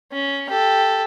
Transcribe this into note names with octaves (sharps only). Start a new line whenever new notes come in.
C#4
G4 A4